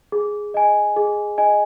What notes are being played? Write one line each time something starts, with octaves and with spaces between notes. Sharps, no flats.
G#4
D#5 G#5
G#4
D#5 G#5